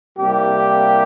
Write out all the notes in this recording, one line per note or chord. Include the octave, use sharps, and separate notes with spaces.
C2 C3 G3 A#3 G4